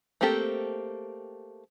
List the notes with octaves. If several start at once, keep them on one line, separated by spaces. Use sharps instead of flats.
A3 A#3 C4 G4 A4